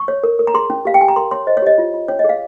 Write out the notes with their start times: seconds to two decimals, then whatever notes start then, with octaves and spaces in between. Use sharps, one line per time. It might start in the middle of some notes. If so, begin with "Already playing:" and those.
Already playing: C#6
0.08 C#5
0.24 A#4
0.39 A#4
0.47 A#5
0.54 G#4 C6
0.70 C#4
0.85 G4 F5
0.94 G5
1.01 G4 G#5
1.08 A#5
1.16 A#4 C6
1.31 C#5 C6
1.47 C5 D#5
1.57 C#5
1.62 G4 D#5
1.78 F4
1.94 F4
2.08 C#4 C#5
2.19 D#5
2.24 G#4 F5